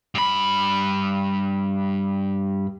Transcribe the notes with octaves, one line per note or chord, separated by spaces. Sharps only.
G2 B5